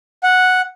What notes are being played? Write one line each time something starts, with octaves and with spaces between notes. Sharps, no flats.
F#5